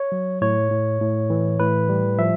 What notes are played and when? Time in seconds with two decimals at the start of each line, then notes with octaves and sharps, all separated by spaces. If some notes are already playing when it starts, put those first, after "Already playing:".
Already playing: C#5
0.12 F#3
0.41 A2 C#5
0.71 A2
1.01 A2
1.30 E3
1.60 A2 B4
1.89 G3
2.18 F3 E5